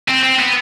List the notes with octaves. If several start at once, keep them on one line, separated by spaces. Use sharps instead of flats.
C4
C4
B3